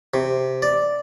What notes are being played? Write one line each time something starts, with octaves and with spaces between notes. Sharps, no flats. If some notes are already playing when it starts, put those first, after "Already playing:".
C3
D5